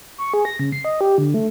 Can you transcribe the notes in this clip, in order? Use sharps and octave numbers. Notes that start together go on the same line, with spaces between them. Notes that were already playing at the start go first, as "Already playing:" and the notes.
C#6
G#4
A#6
C#3
C7
D#5
G4
D3
A3